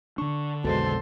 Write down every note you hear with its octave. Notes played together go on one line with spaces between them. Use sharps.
D3 D4 C#6
B1 F2 B2 D#3 F3 G#3 A4 C5